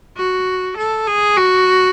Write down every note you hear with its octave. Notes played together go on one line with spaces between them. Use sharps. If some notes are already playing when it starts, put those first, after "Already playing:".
F#4
A4
G#4
F#4